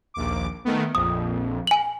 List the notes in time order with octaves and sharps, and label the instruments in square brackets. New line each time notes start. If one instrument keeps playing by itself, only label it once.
[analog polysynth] A#1 D#2 D6
D#3 A3 B3
[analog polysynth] A#1 F2 [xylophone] D#6
[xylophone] G#5 F#7